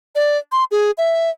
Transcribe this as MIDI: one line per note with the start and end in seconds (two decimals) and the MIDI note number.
0.15 0.38 74
0.52 0.64 84
0.71 0.91 68
0.98 1.30 76